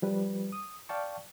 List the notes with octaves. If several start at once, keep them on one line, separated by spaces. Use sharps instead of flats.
F3 G3 B4
D#6
D5 F5 G5 A5 C#6